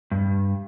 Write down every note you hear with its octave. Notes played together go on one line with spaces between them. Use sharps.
G2